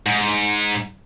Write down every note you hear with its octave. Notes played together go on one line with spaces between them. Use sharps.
G#2